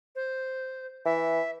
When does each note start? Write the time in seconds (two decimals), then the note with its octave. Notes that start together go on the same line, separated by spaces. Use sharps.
0.16 C5
1.05 E3 E5